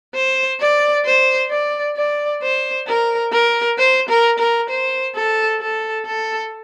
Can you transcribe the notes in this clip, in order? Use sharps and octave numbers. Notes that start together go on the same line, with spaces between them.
C5
D5
C5
D5
D5
C5
A#4
A#4
C5
A#4
A#4
C5
A4
A4
A4